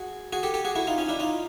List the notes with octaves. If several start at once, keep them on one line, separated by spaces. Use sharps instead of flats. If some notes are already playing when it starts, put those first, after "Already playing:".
Already playing: F#4 G#4
F#4 G#4
G4 A4
G4 A4
F#4 G#4
E4 F#4
D#4 F4
C#4 D#4
D4 E4
D#4 F4